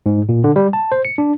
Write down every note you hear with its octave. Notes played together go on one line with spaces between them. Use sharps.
G#2
A#2
D3
G3
A5
C5
C#7
D4